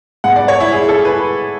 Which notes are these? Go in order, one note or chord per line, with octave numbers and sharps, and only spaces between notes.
G#2 G#3 B3 F#5
D5
C#5
E4
G#4
A4
B4